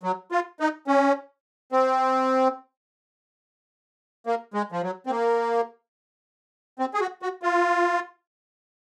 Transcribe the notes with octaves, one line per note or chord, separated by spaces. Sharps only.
F#3
F4
D#4
C#4
C4
A#3
G#3
F3
F#3
C4
A#3
C4
G#4
F#4
F#4
F4